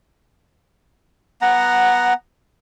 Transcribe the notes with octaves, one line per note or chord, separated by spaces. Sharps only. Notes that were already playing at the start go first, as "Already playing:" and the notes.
B3 F#5 A#5